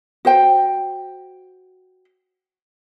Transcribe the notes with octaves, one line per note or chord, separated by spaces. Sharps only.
F#4 C5 G5